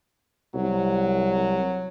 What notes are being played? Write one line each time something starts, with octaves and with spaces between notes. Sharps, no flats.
C2 F#3